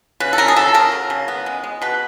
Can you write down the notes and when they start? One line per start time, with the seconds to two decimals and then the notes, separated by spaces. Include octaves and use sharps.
0.20 C#3 B4
0.33 A4
0.38 C#3 A#4
0.48 G#4
0.56 C#3 A4
0.74 C#3 A#4
0.92 F#3
1.10 C#3
1.28 B3
1.46 G#3
1.64 G#3
1.82 B2 B4